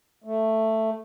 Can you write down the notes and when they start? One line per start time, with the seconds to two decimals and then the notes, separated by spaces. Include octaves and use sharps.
0.24 A3